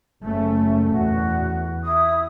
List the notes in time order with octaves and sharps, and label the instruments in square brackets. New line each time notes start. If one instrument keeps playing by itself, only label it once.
[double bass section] F#1 A3 C#4
[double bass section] E2 [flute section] F#4
[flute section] E4 D#6